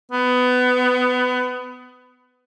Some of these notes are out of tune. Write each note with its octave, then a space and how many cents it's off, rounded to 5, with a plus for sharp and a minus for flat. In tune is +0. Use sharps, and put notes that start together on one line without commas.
B3 +20